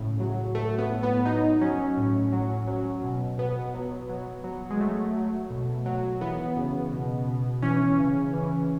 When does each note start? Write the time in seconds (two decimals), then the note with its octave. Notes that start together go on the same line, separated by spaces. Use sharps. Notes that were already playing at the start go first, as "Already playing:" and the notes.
Already playing: A2 C#3
0.20 F#3
0.55 A2 A3
0.78 B3
0.91 A2
1.03 B3
1.25 F#3 D#4
1.61 F#3 C#4
1.97 A2
2.32 F#3
2.67 F#3
3.03 B2
3.38 B2 B3
3.74 F#3
4.09 F#3
4.44 F#3
4.70 G#3
4.79 F#3 A3
5.16 F#3
5.50 B2
5.86 F#3
6.21 E3 B3
6.57 C#3
6.92 B2
7.28 B2
7.62 E3 C#4
7.99 C#3
8.33 E3